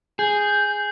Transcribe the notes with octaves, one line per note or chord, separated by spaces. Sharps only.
G#4 G6